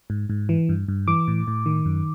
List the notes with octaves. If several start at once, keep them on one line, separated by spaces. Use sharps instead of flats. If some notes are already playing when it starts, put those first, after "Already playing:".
G#2
G#2
E3
G2
G2
E3 D6
A2
A2
D#3
F#2